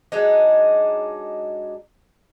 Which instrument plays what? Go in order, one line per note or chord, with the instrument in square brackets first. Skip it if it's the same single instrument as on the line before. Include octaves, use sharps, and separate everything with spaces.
[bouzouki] F#3 G#3 D4 D#4